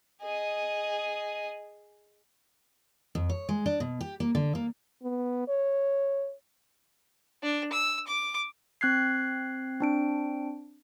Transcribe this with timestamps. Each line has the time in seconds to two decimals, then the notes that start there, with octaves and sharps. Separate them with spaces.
0.23 G#4 D#5
3.15 F2
3.29 C#5
3.49 G#3
3.66 D4
3.80 B2
4.01 G4
4.20 A#3
4.35 D3
4.55 A#3
5.03 B3
5.48 C#5
7.42 D4
7.72 E6
8.07 D6
8.81 C4 F#6 G#6 C7
9.80 C4 D4 D7